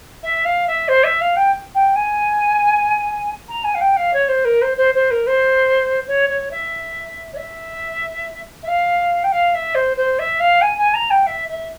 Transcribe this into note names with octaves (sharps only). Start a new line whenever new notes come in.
E5
F5
E5
C5
E5
F5
G5
G5
G#5
A#5
G#5
F5
G5
F5
C#5
C5
A#4
C5
C5
C5
A#4
C5
C#5
C#5
E5
C#5
E5
E5
F5
G5
F5
E5
C5
C5
E5
F5
G#5
G#5
A#5
G5
E5
E5